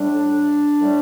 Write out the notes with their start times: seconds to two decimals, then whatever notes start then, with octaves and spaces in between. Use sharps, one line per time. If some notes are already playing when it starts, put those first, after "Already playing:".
Already playing: A2 G3 D4
0.81 A2 G3